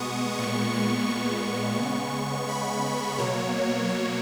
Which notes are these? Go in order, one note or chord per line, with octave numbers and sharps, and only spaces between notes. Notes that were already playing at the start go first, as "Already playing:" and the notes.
Already playing: B2 G#3 B3 C#6 D#6
A#2 G#3 B3 C#6
C#6
C#6
C#3 G#3 B3
B5
B2 F#3 A#3 C#5
C#5